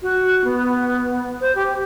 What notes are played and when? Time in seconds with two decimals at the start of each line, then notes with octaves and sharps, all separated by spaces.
0.02 F#4
0.44 B3
1.41 C5
1.55 G4